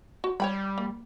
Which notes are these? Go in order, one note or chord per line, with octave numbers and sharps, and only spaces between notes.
F#4
G3 C#5 G5 B5
A#3